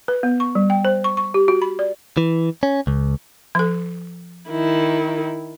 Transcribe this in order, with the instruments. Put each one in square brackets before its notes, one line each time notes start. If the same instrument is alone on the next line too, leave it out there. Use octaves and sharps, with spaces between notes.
[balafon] B4
B3
C#6
G3
G5
C5
C#6
C#6
G4
F#4
B5
D5
[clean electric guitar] E3
C#4
C#2
[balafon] F3 A4
[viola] D#3 E4